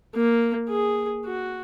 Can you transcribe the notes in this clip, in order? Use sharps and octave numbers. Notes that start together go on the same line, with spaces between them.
A#3
G#4
F#4